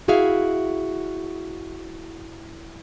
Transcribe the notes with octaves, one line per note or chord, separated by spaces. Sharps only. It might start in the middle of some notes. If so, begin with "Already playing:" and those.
E4 F#4 G#4 E5 F5